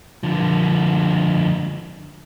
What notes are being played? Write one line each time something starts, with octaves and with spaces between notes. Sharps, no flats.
D3 F3